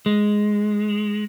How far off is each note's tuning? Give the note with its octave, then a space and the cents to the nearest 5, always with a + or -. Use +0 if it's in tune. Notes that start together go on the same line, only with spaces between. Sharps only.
G#3 +5